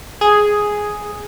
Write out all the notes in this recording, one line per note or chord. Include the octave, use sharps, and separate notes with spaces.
G#4